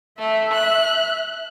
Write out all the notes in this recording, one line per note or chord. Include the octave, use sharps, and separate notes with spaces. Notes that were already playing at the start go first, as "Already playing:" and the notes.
A3 E5
F#6